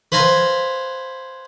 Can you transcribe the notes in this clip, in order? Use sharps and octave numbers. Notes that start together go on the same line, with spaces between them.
B4 C5 F5 G#5 A#5